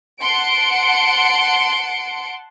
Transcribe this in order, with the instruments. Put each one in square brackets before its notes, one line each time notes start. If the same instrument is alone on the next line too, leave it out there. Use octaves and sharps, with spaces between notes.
[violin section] F#5 A5 C6 C#7 D7